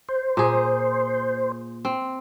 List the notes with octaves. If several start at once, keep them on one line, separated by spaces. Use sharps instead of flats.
C5
A#2 G#4
C4